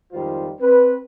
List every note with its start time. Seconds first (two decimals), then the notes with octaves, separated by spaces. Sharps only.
0.12 G#1 F2 D#3 G3 F4 C5
0.60 C4 B4